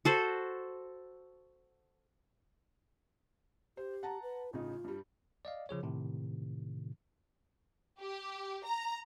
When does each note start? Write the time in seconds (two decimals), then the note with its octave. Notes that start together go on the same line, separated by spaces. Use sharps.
0.05 F#4 A4 C5
3.77 G4 C5
4.03 F#5 A5 A#5
4.23 B4
4.53 A1 C#3 D#4 F4
4.84 G2 G3
5.45 D5 D#5 F5
5.69 C#3 F3 G#4 C#5
5.83 A2 C3 D#3
7.98 G4
8.65 A#5